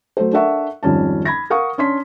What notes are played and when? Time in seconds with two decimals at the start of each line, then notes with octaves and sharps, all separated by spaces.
0.17 F#3 A3 A4 C5
0.33 D4 A4 A#4 E5 F#5 C#6
0.83 G#1 F2 G3 C#4 A5
1.25 B5 G#6 A#6
1.50 A#4 F5 F#5 C#6 D#6
1.78 C#4 D4 C6 B6